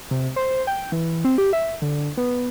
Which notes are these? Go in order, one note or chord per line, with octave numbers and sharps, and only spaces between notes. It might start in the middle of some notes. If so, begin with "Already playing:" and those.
C3
C5
G5
E3
C4
G4
E5
D3
B3